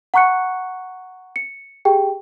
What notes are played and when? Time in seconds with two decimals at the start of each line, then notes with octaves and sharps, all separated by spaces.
0.14 F#5 A#5 C#6 F#6 C#7
1.36 C#7
1.85 G4 G#4 G5